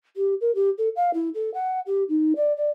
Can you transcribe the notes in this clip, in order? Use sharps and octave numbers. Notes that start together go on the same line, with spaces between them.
G4
A#4
G4
A4
F5
E4
A4
F#5
G4
D#4
D5
D5